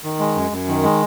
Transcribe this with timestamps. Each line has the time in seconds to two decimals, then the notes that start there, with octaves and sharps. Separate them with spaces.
0.04 D#3
0.19 G#3
0.35 F#2
0.51 F#2
0.68 D#3
0.84 G#3